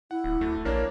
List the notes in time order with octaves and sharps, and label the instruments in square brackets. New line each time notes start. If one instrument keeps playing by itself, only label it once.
[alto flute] E4 [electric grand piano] F#5
[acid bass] D1
[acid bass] D2 [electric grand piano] A3
[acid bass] A#1 [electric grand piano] A#3 D4 A#4 [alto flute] C#5